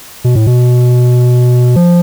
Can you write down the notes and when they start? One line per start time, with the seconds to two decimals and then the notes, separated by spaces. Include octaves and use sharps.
0.24 B2
0.35 A2
0.47 B2
1.76 F3